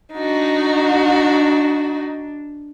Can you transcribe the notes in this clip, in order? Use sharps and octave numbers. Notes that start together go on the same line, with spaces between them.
D4 D#4 F#4